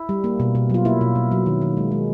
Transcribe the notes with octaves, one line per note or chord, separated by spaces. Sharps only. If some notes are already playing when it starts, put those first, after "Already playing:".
Already playing: E4
G3
A#3
B2
B2
F#3 F4
A#3 E4
B2
B2
F#3
D#3
D#3
G#3
G#3